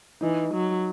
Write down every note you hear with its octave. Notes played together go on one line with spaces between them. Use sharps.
E3 D#4
F#3